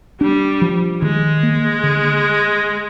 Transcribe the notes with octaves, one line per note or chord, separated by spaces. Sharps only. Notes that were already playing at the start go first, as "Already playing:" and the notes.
G3 D4
F3
D#3 G#3
A#3
D3